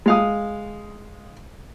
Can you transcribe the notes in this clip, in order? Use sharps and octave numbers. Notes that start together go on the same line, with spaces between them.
G#3 F5 D#6